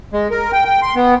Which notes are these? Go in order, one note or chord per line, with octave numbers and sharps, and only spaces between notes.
G#3
A#4
G5
G5
C6
B3